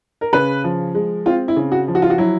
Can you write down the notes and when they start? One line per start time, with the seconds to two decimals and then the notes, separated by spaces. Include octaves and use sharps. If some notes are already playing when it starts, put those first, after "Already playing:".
0.21 A#4
0.33 C#3 B4
0.64 F3
0.94 G#3
1.26 C4 F4
1.48 E4
1.56 C#3
1.72 F#4
1.88 F3
1.95 F#4
2.02 F4
2.10 F#4
2.18 F#3 E4